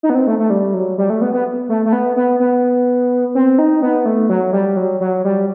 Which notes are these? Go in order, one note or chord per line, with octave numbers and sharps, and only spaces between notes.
D#4
B3
C4
A3
A3
G3
F#3
G3
A3
B3
B3
A3
A3
B3
B3
B3
C4
D#4
B3
A3
F#3
G3
F#3
F#3
G3